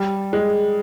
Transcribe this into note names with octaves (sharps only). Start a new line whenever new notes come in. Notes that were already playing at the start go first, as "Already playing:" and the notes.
Already playing: G3
G#3